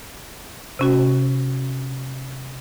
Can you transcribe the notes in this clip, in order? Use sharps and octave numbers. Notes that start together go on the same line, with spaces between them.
C3 C#4 F#4